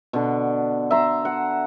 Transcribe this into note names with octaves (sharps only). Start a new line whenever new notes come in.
B2 D3
E5 A#5 C6
F#5